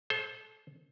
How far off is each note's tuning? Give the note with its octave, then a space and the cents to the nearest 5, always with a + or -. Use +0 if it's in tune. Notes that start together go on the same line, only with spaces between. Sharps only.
A4 -25 C5 +20